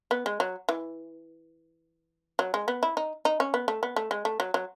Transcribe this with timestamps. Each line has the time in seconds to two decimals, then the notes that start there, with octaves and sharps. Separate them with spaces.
0.11 B3
0.26 G#3
0.40 F#3
0.69 E3
2.39 F#3
2.54 G#3
2.68 B3
2.83 E4
2.97 D#4
3.25 D#4
3.40 C#4
3.54 B3
3.68 A3
3.83 B3
3.96 A3
4.11 G#3
4.25 A3
4.40 F#3
4.54 F#3